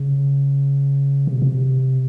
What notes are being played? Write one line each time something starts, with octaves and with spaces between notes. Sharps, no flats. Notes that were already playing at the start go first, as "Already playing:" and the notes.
Already playing: C#3
C3
B2
C3